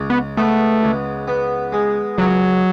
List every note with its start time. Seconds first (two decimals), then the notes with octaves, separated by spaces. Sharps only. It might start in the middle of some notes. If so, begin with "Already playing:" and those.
Already playing: C#2
0.10 B3
0.37 A3 B3
0.83 C#2
1.28 B3
1.72 G#3
2.18 C#2 F#3